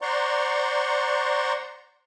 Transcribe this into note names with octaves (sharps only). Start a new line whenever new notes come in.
C5 D5 F#5 A#5 C6 C#6